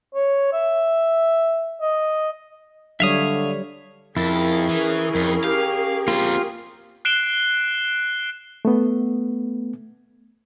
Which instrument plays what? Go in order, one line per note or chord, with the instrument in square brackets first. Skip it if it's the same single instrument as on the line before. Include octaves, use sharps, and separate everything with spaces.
[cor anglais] C#5
E5
D#5
[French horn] D3 [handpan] F#3 G3 C#5 [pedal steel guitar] E5 F5 D#6
[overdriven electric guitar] F2 [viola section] C#4 G#4 A#4 [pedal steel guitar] E4 [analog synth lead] A6
[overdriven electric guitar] E3 [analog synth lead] C7
[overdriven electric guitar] F2
[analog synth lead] G4 [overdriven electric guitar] F5
[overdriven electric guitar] A#3 C4 [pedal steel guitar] F4
[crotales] F#6 C7 D7 E7 G7
[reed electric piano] A3 B3